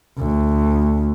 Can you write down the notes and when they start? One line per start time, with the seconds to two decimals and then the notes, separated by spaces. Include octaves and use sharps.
0.18 D2